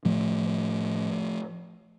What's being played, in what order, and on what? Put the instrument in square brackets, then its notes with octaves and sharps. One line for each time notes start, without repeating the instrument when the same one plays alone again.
[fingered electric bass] A2 F3 A3